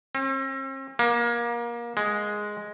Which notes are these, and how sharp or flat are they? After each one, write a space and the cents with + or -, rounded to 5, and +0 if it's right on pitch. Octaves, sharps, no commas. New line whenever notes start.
C4 +45
A#3 +25
G#3 +0